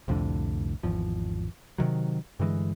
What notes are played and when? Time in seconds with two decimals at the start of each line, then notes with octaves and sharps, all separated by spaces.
0.08 C2 F2 A2 D3
0.83 G#1 E2 F3
1.78 C3 D#3 F#3
2.39 G2 D3 E3 G#3